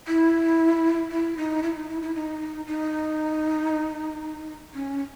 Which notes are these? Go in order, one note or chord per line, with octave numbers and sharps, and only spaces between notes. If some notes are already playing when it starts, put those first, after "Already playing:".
E4
E4
D#4
E4
D#4
E4
E4
D#4
D#4
C#4